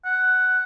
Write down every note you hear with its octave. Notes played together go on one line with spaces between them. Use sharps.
F#5